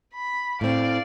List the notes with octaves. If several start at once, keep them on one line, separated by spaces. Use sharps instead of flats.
B5
A2 C4 D5 F5